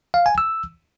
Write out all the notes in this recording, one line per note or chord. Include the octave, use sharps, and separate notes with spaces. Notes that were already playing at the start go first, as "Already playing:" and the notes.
F5
G#5
E6